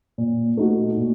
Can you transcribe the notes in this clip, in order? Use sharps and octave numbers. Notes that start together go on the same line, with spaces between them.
A#2
A3 D#4 F#4
A#2